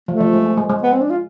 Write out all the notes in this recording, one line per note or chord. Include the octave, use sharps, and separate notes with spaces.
F3 A3
F3
G#3
G#3
G#3
G#3
B3
C4
D4
F4